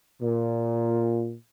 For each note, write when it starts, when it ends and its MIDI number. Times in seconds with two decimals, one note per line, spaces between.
0.22 1.34 46